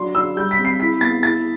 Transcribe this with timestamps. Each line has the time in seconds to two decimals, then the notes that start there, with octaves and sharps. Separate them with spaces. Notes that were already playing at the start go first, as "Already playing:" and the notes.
Already playing: F#3 D4 C6
0.14 D4 E6
0.37 G3 G6
0.51 B6
0.58 C4
0.65 C7
0.80 E4 B6
1.01 B3 A6
1.23 E4 A6